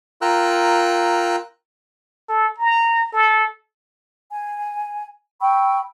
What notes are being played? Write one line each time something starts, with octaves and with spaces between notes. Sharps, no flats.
F4 A#4 G5 A#5 E6 F#6
A4
A#5
A4
G#5
G5 B5 C#6 E6